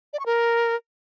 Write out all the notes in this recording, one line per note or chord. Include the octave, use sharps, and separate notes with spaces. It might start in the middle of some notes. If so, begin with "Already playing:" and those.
D5
C#6
A#4